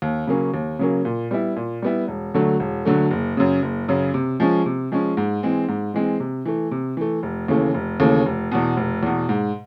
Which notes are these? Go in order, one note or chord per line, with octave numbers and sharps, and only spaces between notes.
D#2
C#3 F#3 A#3 C#4
D#2
C#3 F#3 A#3 C#4
A#2
G3 B3 E4
A#2
G3 B3 E4
E1
D2 D3 F#3 A3
E1
D2 D3 F#3 A3
F#1
F#2 C#3
F#1
F#2 C#3
C3
F3 G#3 C#4
C3
F3 G#3 C#4
G#2
E3 G#3 C4
G#2
E3 G#3 C4
C3
E3 A3
C3
E3 A3
F1
D#2 C#3 E3 A3
F1
D#2 C#3 E3 A3
F1
E2 B2
F1
E2 B2
G#2